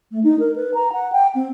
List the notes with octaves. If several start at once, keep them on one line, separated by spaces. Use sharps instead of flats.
A3
D#4
A#4
B4
A#5
F#5
G5
C4